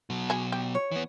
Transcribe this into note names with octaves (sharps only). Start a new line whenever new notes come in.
B2 F#3
F#4 G#4
G4
C#5
E3 B3